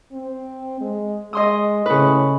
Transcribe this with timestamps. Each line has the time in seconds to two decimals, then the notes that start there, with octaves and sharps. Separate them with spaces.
0.12 C4
0.81 G#3
1.33 G#3 D#5 C6 D#6
1.86 A2 C#3 B4